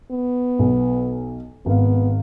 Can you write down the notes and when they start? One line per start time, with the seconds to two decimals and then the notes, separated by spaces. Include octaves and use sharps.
0.11 B3
0.59 B1
1.66 G#1 B3 F5